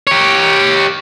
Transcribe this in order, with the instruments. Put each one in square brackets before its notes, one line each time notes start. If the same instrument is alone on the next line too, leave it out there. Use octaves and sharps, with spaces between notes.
[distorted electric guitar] G4 C#5